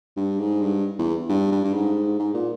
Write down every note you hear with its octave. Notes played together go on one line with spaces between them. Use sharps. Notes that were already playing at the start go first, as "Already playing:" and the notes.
G2
G#2
G2
E2
G2
G2
G2
G#2
G#2
A#2